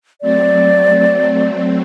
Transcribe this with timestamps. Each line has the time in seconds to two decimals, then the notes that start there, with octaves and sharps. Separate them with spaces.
0.21 F#3 A3 C4 D5